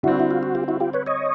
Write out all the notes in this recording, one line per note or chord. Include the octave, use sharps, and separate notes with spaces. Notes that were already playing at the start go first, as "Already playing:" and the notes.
D3 G3 C4 E4 F#4
E4
F4
F#4
F4 G4
E4 F#4
F4 G4
B4 C#5
C#5 D#5